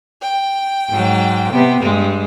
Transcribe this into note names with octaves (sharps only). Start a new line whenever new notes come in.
G5
G#2 F#3
C3 B3
G2 G#3